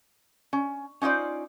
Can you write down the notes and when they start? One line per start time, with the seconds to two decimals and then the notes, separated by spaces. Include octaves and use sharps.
0.53 C#4
1.02 C#4 D#4 F4 C5 D5